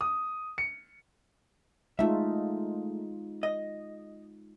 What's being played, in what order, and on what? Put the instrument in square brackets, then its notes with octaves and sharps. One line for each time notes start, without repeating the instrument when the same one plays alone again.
[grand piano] D#6
C#7
[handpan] G#3 D#4 F4 [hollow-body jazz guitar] A3 E5
[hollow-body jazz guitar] D#5